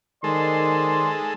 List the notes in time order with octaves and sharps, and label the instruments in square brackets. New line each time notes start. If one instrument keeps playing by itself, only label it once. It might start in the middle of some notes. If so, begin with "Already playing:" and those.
[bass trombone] D#3 [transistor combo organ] G#3 A4 [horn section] C5 D5 C6